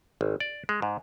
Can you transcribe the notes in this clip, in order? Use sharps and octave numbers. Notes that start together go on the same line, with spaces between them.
G#1
D5
G#3
G#2